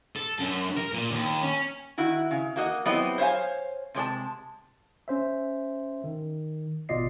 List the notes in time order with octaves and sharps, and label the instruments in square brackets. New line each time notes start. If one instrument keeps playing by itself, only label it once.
[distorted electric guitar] A4
F#2
A#4
A#2
D#2
C#4
[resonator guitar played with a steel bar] D#3 E4 F#4
C#3
A#3 F#4 D#5
F#3 B3 C4 E4 G4 D#5
C5 C#5 E5 F5 G#5
C3 G#3 D5 A5
[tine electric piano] C#4 C5 E5
D#3
G#1 B2 F4 D5 D#5 C7